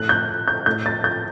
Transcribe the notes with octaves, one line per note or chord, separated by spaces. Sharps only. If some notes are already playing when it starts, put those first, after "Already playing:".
Already playing: A2 F#6
G6
G6
A2 G6
A6
G6